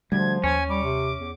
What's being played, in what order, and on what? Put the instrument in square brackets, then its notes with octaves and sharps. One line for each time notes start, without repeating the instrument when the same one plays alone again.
[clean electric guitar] D2 [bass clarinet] F3 [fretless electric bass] G3 [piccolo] G#6
[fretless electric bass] D#2 [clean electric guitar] C#4 [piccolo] G#5
[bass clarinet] G3 [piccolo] D6
[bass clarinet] C3
E2